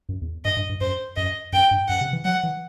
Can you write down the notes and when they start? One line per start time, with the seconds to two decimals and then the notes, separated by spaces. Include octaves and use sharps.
0.09 F#2
0.22 E2
0.45 G2 D#5
0.57 G2
0.69 G2
0.81 F#2 C5
1.16 F#2 D#5
1.52 F#2 G5
1.71 G2
1.88 F#2 F#5
2.01 C3
2.13 E3
2.25 F#3 F#5
2.43 E3